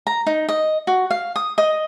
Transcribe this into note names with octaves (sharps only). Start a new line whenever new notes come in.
A#5
D#4
D#5
F#4
F5
D#6
D#5